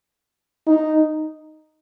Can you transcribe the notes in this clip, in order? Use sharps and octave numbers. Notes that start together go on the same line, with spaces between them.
D#4